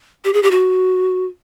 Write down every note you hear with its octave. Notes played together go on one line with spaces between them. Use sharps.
G4
G#4
G4
F#4